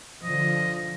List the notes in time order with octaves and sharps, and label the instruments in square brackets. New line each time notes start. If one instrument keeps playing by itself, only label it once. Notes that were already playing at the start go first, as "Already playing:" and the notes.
[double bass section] D3 F3 [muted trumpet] D#5